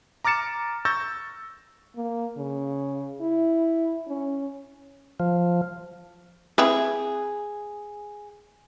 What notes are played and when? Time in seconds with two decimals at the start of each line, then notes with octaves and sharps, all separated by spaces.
0.24 A#5 D6 F6 A6 C#7 E7
0.85 C#6 E6 G6 A6 A#6
1.96 A#3
2.37 C#3
3.21 E4
4.08 C#4
5.20 F3
6.58 C4 E4 G#4 B4